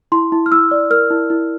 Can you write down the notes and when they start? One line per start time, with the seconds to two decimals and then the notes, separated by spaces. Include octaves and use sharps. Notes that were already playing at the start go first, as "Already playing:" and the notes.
0.12 E4 C6
0.32 E4
0.46 F6
0.51 E4 E6
0.71 D5
0.90 A#4 F6
1.10 E4
1.30 E4